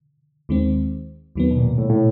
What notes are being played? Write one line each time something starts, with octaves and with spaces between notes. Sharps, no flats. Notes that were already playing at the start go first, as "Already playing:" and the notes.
D#2 D#3 G#3 C4
D#2 D#3 F#3 B3
B2
A#2
A2
A2